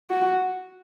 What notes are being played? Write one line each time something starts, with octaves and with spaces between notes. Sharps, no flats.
F#4